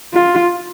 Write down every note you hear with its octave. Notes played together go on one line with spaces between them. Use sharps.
F4